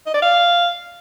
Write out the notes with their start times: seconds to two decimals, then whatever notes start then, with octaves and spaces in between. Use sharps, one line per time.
0.06 D#5
0.14 D5
0.22 F5